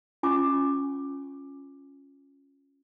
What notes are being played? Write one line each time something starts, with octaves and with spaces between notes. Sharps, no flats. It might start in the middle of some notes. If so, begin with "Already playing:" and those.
C#4 F4 G#5 C#6 D6